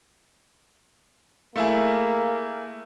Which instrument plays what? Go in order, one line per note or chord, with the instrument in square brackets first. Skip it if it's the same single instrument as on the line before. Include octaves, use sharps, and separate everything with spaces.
[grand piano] A3 E4 G#4 [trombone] A#3